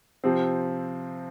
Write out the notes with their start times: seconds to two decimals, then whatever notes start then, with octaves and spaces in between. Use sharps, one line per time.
0.24 C3 F3 C4